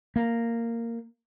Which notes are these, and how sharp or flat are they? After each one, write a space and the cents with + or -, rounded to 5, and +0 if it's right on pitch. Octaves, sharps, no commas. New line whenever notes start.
A#3 -10